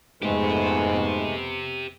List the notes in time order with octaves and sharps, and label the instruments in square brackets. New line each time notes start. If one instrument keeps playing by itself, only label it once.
[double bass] F2 B3 [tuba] G#2 [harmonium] G#3 A3 [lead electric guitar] G4 C5